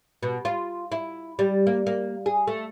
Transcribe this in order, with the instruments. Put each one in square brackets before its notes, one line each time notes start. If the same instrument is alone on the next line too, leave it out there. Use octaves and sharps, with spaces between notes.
[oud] B2
F4
E4
G3
A#3
A#3
G#4
A3